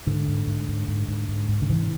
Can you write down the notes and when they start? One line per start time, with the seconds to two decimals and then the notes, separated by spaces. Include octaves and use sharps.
0.07 G#2 D3
0.28 G#2
0.47 G#2
0.68 G#2
0.88 G#2
1.08 G#2
1.28 G#2
1.48 G#2
1.62 D3
1.69 C3 E3